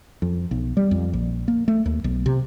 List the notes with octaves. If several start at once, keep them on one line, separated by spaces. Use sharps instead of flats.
F2
B1
G3
F2
A#1
A#3
A3
D#2
B1
C3